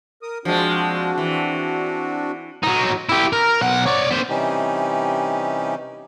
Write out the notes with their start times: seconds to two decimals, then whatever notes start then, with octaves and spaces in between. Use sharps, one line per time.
0.22 A#4 D#6
0.45 F3 G#3 C4 D4 F#4
1.18 E3
2.63 F#3 D#4
3.09 E4 G4
3.33 A#4
3.61 B1 F#5
3.86 C#5 D5
4.10 B3 C5
4.29 C3 E3 G3 C#4 D#4 G4